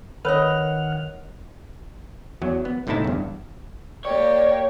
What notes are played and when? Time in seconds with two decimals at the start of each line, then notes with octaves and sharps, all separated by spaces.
0.25 D#3 A#4 B4 C#5 D#5 F#5 F6
2.42 E2 F#3
2.65 B3
2.87 G1 A2 C3 D#4 E4 A5
3.05 E2 G2
4.05 A#3 G4 C#5 D5